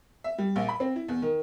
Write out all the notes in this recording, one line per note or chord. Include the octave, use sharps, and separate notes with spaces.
E5
G3
A#1
B5
C4
E4
E2
D#3